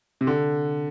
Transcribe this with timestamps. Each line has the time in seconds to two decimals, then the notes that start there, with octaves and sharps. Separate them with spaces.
0.21 C3
0.27 D3